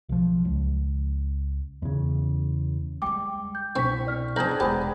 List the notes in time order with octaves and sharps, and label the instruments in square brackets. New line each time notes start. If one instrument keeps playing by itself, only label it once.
[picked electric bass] B1 F3
C#2
E2 C#3
[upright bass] G3 G#3 [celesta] G5 D6
[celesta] G6
[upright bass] C2 B2 [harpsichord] C4 [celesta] D4 B6 [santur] C#6
[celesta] D5 F6 B6
[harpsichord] E2 C5 [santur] D4 G#4 A#5 [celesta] G5 G6 F#7
[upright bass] E1 G#3 [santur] B3 G#4 [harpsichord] G4 [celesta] C5